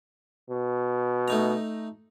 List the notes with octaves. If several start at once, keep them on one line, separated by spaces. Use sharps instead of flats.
B2
A3 D#4 A#5